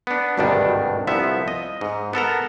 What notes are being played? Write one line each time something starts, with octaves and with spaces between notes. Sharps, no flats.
B3 D4
G#1 D2 G2 B2 D#3 D4
C2 F3 B3 E5
D#5
G#2
B3 A4 A#4 A#5